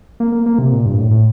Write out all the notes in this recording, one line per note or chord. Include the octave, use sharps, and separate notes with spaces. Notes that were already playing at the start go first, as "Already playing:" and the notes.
A#3
A#3
A#3
C3
A#2
G2
A2
A2